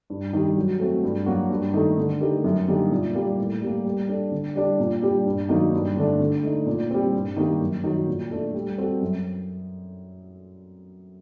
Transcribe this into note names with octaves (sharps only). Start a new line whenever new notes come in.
G2
D#3 G3
F#3
A3 C4 F#4
G2
F#3 A#3 F#4
G2
D#3 A3 D#4 A4
D3
A3 D#4 G4 A#4
F#2
D3 G3 A#3 D#4
A#2
G3 A#3
A2
G3 A#3
G3
D4 A4
D3
G3 D4
A#2
G3 D4 G4
G2
D#3 F#3 A#3 D#4
G2
D3 A3 D4 A4
D3
A3 D#4
A#2
G3 C4
G2
D#3 G3 A#3
F#2
D#3 F#3
A#2
A3 D4 A4
G3
C4 F#4 A4
F#2